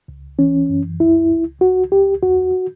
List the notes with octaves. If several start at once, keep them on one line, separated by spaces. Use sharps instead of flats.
C#2
E3 C#4
F#2
C#2 E4
C#2
C#2 F#4
C#2 G4
E2 F#4